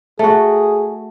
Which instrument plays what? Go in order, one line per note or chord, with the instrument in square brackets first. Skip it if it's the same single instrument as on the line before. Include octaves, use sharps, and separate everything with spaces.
[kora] A3 F#4 [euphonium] G#4